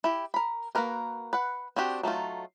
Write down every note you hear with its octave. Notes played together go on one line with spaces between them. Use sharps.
E4 G4
A#4 B5
A#3 C#4 F#4 A#4 B4
B4 F#5
C4 D4 F#4 G4
F#3 A3 D#4 F4